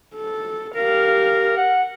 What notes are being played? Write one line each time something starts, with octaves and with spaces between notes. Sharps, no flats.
A4
G4 A#4 F5
F#5